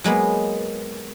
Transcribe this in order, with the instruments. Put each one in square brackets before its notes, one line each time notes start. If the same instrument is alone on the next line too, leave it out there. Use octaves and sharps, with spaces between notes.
[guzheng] F#3 G#3 A#3 B3